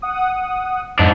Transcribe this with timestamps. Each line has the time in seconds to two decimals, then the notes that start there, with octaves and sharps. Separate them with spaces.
0.02 F#5 D#6
0.99 F2 G#2 D4